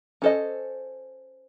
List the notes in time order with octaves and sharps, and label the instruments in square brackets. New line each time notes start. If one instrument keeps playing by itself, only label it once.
[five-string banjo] C#4 A4 C5 D#5